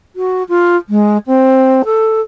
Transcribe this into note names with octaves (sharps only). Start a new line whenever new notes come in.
F#4
F4
G#3
C4
A4